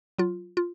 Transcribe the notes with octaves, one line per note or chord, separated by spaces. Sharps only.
F#3 F4
F4